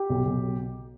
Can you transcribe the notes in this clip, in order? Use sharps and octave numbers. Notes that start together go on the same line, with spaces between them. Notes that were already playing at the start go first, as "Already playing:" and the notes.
Already playing: G4
B1
B1